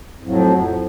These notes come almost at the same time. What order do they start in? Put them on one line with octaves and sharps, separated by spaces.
F2 A2 F#3 F3